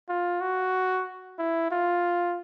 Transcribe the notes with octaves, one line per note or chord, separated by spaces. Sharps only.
F4
F#4
E4
F4